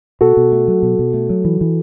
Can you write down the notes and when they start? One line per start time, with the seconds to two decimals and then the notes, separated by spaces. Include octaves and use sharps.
0.21 B2 F#4 A4
0.37 B2
0.52 A3
0.68 F#3
0.83 B2
0.99 B2
1.14 A3
1.30 F#3
1.45 E3
1.61 E3